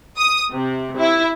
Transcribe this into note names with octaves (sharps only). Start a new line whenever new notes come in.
D#6
C3
E4